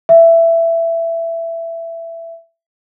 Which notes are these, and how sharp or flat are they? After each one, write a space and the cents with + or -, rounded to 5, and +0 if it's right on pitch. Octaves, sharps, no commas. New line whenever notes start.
E5 +15